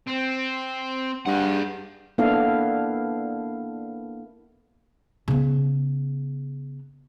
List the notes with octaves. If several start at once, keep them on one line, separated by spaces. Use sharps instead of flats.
C4
G2 G#4 F#5
A#3 B3 D4 E4 A4 F5
C#3 B3